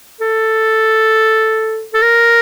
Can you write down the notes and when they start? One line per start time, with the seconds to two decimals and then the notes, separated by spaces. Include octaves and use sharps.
0.21 A4
1.94 A4
2.02 A#4